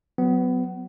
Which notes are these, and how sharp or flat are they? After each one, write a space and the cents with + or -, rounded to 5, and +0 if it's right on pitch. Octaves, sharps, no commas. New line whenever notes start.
F#3 +0 B3 +25